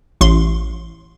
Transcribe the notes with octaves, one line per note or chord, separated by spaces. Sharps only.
A1 C6